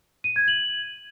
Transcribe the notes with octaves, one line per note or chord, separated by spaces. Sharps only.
D#7
G#6
F#7